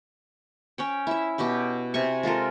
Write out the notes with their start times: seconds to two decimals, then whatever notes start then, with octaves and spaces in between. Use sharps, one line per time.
0.78 C#4 C#5 G5
1.07 E4 E5
1.38 B2 F#4 G4 G5
1.94 C3 G#5 C#6
2.23 G#3 F4 A4 A#4